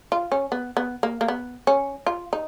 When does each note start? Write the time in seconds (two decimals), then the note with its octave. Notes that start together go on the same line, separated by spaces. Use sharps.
0.12 F4
0.32 C#4
0.52 B3
0.77 B3
1.03 A#3
1.21 A#3
1.28 B3
1.67 C#4
2.06 F4
2.33 D#4